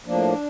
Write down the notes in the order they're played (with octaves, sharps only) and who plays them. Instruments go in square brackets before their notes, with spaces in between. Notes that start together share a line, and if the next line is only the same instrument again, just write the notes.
[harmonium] A2 F3 A#3 D4